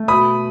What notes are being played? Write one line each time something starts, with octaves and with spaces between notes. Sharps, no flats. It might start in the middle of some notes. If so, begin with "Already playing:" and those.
Already playing: A3
B2 B5 D#6